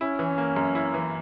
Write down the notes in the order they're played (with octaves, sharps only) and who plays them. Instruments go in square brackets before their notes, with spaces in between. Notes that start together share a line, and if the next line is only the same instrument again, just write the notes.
[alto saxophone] C#4 [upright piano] E4
[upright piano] E3
A#3
F#2
E4
E3